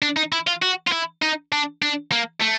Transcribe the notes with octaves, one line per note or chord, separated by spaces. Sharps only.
D4
D#4
E4
F4
F#4
F4
E4
D#4
D4
D4
A#3
A3